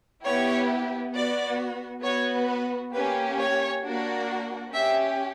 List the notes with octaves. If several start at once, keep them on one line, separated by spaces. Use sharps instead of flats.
B3 E4 G4 C#5
B3 F#4 D5
B3 F#4 C#5
B4
A#3 C#4 G4 B4
C#5
A#3 D4 F#4
C#4 G4 E5